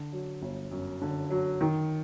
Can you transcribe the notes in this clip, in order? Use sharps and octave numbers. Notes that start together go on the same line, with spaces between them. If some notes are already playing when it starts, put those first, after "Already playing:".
Already playing: D3
F#3
G1
F#2
D3
F#3
D#3